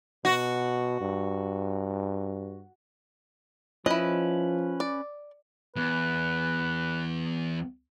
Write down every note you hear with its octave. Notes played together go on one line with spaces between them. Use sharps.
B2 F#4
G2
F3 C#4 E4 B4 D#5
D5
E2 B4